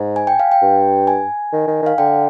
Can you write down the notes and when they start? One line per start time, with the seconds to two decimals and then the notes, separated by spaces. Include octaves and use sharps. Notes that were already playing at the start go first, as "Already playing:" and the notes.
Already playing: G#2
0.16 G#5
0.27 G5
0.40 F5
0.52 G5
0.62 G2
1.07 G#5
1.52 D#3
1.67 D#3
1.82 D#3 F5
1.98 D3 G5